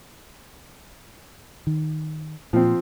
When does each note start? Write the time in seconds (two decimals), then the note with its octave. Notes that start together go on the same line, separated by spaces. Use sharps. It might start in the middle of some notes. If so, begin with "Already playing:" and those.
1.67 D#3
2.53 A#2 F3 C4